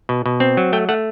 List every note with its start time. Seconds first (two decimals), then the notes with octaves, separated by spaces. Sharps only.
0.09 B2
0.26 B2
0.40 C4
0.57 F#3
0.73 A3 G5
0.89 A3 F#5